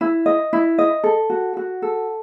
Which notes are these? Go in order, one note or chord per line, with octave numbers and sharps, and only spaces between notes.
E4
D#5
E4
D#5
A4
F#4
F#4
A4